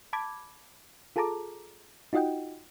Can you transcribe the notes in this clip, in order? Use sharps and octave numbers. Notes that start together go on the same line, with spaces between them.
A5 B5 D6 G#6
F4 G#4 A4 A5 A#5 D6
D#4 F4 F#4 D#5 F#5 G5